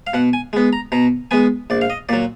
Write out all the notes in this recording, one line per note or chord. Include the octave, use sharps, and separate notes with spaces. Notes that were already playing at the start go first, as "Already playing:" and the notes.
F5
B2 F#5
G#5
G#3 B3
A#5
B2 A#5
G#3 B3 G#5
A#1 D5
F5
D#5
A#2 F#3 D5